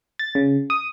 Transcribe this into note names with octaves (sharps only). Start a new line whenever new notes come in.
A6
C#3
D#6